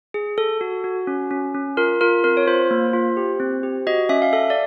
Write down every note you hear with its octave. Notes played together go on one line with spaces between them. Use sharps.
G#4
A4
F#4
F#4
C#4
C#4
C#4
F4 A#4
F4 A#4
C4 A#4
C#5
F4 C5
A#3
F4
G4
C4
G4
F#4 D#5
C#4 E5
F5
A4 E5
D5